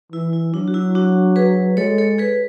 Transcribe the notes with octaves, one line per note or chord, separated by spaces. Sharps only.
E3 E4
E4
F#3 D4
F#4
E4
D4 F#4
G#4 B4
G#3 A4 C#5
A4 C#5
G#4 B4